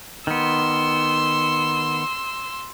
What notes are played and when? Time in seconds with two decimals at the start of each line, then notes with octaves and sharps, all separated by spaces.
0.27 D#3 B3 C6 E6